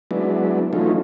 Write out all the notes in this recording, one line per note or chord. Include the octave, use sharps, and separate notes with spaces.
F#3 G#3 B3 D4 E4
E3 F#3 A3 C#4 D#4 F4